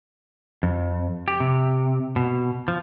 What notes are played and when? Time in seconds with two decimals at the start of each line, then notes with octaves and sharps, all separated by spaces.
0.63 F2
1.28 G4
1.40 C3
2.16 B2
2.68 F3